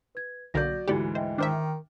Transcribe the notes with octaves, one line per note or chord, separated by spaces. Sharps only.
B4 G#6
B1 D3 F#3 A#3 D5 G6 A#6
D2 G#2 E3 E4 F#4 G4 D5 C#7
C5 D#5 E5 G5
D#3 D4 C5 E5 G5 D6 F6